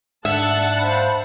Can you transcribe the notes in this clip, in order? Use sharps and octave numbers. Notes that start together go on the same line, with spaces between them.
G#2 D4 E5 F#5 A5
C5 F5 B5